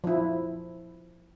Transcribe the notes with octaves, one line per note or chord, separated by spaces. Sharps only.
F3 E4